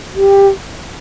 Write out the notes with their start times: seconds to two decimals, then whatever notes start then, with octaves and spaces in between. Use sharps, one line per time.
0.15 G4